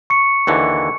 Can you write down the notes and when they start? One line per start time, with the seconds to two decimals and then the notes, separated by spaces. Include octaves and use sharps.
0.10 C#6 C#7
0.47 D#2 D3 E3